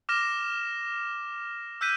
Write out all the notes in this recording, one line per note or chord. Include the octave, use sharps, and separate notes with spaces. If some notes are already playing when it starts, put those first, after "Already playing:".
D6 F6 A#6 E7
E6 F#6 G6 B6 D#7